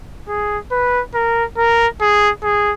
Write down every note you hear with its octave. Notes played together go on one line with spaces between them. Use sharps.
G#4
B4
A#4
A#4
G#4
G#4